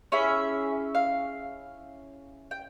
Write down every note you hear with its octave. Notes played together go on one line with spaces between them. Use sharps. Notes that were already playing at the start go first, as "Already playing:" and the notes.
C#4 E4 G#4 E5
F5
G5